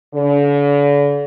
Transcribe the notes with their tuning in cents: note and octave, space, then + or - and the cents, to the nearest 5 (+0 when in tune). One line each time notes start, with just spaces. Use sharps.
D3 -45